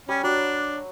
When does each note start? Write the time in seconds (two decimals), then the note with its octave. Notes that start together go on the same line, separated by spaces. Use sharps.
0.08 G3 C#4
0.23 F#3 D4